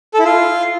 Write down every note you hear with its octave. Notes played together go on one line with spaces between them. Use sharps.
A4
E4
F4